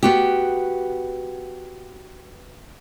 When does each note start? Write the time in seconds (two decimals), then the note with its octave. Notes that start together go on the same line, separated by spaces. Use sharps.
0.03 B3 F#4 G4